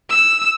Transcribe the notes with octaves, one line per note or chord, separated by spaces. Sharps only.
E6